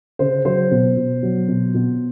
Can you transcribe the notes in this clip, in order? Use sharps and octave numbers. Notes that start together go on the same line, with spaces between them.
C#3 C5
F#3 C5
B2
B2
F#3
B2
B2